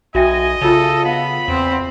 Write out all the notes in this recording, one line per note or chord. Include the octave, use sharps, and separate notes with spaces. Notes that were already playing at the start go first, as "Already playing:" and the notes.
B1 F#4 D#5 E5 G5 G#5
C#3 F4 A4 C#5
B3 F5 B5
E2 C4